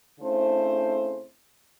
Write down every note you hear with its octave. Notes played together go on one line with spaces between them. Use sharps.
C#3 A3 C4 D4 E4 C5